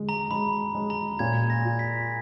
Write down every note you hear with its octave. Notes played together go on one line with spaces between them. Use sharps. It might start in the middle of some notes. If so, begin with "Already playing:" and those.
Already playing: D3 G#3
A#5
G#3 B5
G#3
A#5
A#2 G#6
A#6
F4
B6